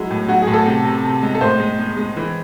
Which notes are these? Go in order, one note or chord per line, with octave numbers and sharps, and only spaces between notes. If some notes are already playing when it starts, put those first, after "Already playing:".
Already playing: F#3 G#3 E4
A2
F#3 F#4
G#4
A2
A4
C3
C3
C3
G#3
A4
A2 C5
G#3
G#3
G#3
E3